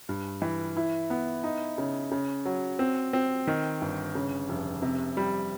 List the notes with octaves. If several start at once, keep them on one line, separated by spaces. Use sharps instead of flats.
G2
E3
E4
B3
D#4
C#3
C#3
F#3
C4
C4
D#3
G1
C#3
F1
C3
G3